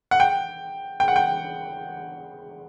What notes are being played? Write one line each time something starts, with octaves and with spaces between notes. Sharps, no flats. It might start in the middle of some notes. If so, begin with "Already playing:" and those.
F#5
G5
G5
F#5
G5